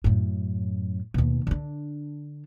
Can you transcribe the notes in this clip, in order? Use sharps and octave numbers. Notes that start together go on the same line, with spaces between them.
F#2 A2
D#2 B2
D3 D4